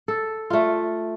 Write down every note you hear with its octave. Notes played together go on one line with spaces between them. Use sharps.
A4
A3 F4